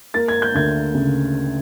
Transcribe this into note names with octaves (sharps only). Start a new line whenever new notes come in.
A#3 A6
G#6
G6
D2 G#6
C#3